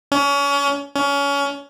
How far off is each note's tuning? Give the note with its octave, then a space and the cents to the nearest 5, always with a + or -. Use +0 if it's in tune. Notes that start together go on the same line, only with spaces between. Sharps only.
C#4 +30
C#4 +25